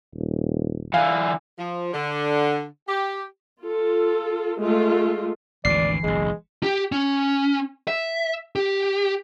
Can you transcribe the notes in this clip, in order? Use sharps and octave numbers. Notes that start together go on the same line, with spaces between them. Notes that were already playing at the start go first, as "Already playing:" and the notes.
D#1
D3 E3 F5
F3
D3
G4
F4 A4
G#3 A3 F4
G#1 D2 B2 E3 D5 C7
F#1 B1 G#3
G4
C#4
E5
G4